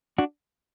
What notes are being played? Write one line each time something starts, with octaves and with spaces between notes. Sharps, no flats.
D4 F#4